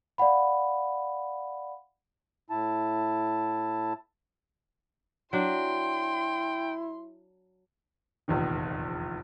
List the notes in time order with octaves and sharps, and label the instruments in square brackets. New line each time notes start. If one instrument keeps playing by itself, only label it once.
[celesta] D5 F5 F#5 B5
[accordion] A2 E4 A5
[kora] F#3 D4 [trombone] E4 [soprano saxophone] G5 [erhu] C6
[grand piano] F1 A#1 E2 D#3